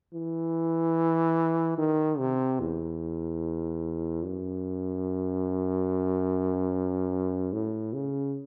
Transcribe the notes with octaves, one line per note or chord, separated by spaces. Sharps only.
E3
D#3
C3
E2
F#2
A2
C#3